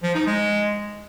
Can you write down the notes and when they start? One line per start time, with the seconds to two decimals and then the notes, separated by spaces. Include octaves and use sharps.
0.03 F3
0.15 D#4
0.26 G#3